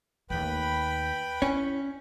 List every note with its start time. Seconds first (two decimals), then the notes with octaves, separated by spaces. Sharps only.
0.30 D#2 A3 B4 G5 B5
1.42 C#4 E4